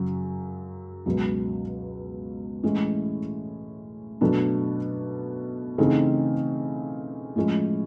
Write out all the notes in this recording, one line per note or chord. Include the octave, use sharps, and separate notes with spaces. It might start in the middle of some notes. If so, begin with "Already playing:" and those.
Already playing: F#2 C#3 F#3
C#2 B2 F#3
A2 E3 G#3 C#4 E4
B2 F#3 A3 D4
C#3 E3 A3 C4 D#4
A2 F3 G#3 C#4